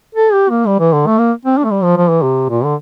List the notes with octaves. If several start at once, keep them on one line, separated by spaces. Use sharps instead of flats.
A4
G4
A#3
G3
E3
D3
A3
A#3
C4
D4
A3
G3
F3
F3
E3
C3
A#2
D3